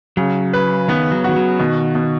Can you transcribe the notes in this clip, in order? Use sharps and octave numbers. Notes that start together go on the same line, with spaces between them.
C#3 F#3
B4
D#3 B3
F#3
D#3 F#4
F#3
B2 D#3
B2